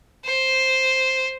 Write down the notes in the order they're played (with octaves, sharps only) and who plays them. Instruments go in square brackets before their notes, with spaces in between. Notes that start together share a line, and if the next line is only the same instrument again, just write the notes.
[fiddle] C5